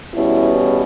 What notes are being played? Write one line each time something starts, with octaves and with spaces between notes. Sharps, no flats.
E2 B2 G3 C#4 E4